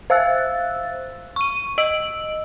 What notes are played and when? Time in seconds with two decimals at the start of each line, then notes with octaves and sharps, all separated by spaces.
0.10 C5 E5 F5 E6 F#6 A6
1.36 C#6 D#7
1.78 D#5 E6 D7 F#7